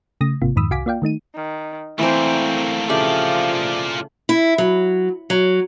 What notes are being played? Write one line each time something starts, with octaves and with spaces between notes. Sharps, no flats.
C#3 A3 D#6 A#6
G#1 C3 A#3 F4
F2 G#2 D#3 B5 D#6 E6
C2 F#4 F5 G#5 D6 B6
A#3 F4 D5 F5 G5
D#3 A3 D#4 D#7
D#3
E3 A3 A#3 C4 C5
C#3 F3 A3 F4 G4 D5
E4
F#3
F#3